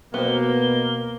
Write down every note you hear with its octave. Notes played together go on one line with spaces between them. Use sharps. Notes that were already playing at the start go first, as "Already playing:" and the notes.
B2 A#3 B3 C5 G7